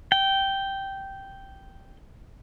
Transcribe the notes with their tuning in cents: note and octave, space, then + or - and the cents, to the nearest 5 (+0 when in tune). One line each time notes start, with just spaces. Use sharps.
G5 -5